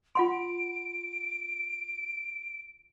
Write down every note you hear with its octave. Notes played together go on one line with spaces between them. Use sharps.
F4 F#5 C6 D7